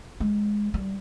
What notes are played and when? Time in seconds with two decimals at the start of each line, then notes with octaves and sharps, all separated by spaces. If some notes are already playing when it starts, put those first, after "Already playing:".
0.20 G#3
0.74 G3